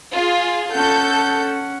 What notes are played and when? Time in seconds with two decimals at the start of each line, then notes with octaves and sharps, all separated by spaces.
0.12 F4 G#4
0.73 C#4 A4 F#5 G6